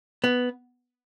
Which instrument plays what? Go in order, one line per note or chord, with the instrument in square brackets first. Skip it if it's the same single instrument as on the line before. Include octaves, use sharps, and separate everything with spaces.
[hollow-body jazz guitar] B3